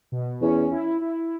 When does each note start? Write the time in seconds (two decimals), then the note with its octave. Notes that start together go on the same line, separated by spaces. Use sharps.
0.12 B2
0.42 E2 C#4
0.71 E4
1.01 E4